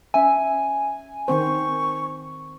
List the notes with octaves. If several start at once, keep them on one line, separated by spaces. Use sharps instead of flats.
C#4 E5 G#5
D#3 C4 C5 C#6